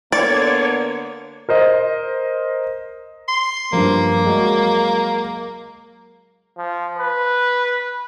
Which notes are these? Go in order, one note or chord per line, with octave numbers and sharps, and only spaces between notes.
D3 A#3 B3 C#5 D5
A#4 C5 D#5
C6
G2 F3 A#3
F#3 G#3
F3
B4